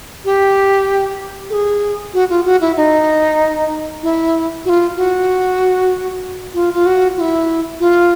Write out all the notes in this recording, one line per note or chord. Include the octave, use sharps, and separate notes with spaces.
G4
A4
G#4
F#4
F4
F#4
E4
D#4
E4
F#4
F4
F#4
F4
F4
F#4
F4
E4
F4